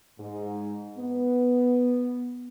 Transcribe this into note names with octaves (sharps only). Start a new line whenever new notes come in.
G#2
B3